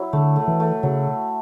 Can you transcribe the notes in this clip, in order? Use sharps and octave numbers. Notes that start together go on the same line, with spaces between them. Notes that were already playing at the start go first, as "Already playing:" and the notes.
Already playing: F#3 E4
D3 A3
A3
E3
A3
C#3 F#3